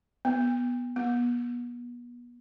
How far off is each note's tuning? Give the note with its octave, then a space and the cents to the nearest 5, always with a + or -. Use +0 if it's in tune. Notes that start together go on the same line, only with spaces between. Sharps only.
B3 -10
B3 -35